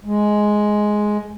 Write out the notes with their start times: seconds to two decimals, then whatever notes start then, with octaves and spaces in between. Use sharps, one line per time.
0.05 G#3